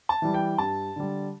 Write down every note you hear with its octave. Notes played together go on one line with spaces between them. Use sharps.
A5
E3 G3
G5
G2 A5
D3 G3